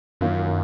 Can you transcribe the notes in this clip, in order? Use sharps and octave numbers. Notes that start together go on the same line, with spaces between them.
F#2 D#3 F#3 A#3 F4